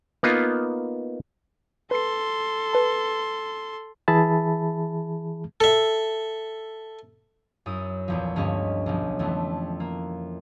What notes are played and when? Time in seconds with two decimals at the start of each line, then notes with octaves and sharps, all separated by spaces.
0.23 A#3 B3 D#4 F4
1.91 A4 B4 C6 C7
2.73 B4 A5
4.08 E3 G#4 E5 A5 B5
5.60 A4 E5
7.66 F#2 E4 D#6
8.08 A#1 E2 F3
8.36 D2 G2 G#3 C#4 D#5 B5
8.86 B1 F3
9.19 F2 E3 A3
9.80 A#3